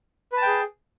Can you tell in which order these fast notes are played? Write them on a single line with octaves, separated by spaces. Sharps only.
B4 A5 G5 G#4